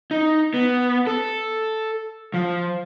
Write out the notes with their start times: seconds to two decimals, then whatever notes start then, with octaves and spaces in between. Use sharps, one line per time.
0.11 D#4
0.54 B3
1.07 A4
2.34 F3